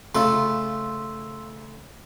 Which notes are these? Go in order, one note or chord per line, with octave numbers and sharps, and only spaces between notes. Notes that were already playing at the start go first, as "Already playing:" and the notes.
C#3 A3 F4 C6 E6